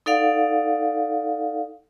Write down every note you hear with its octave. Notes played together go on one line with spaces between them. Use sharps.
D#4 A4 D5 F5 F#5